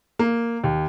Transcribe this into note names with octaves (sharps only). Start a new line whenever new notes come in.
A#3
D#2